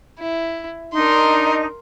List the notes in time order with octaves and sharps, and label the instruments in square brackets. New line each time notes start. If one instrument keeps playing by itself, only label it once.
[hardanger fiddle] E4
[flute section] D4 D#4 [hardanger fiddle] A#4 C6